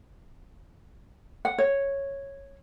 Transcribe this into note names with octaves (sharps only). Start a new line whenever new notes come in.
F#5
C#5